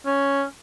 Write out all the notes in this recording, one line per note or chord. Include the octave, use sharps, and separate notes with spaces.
C#4